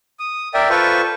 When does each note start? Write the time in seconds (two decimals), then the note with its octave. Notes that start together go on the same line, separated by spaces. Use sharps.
0.19 D#6
0.54 A#4 D5 E5 G5
0.70 F4 A4 B4 C5 C#6